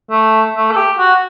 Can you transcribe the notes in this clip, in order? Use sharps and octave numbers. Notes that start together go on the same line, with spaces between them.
A3
A3
A4
G4
F#4